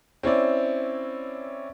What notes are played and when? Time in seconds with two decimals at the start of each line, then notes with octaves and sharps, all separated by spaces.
0.23 C4 C#4 E4 D5